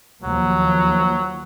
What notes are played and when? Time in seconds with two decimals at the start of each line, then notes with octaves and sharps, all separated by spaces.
0.23 D#2 F3 F#3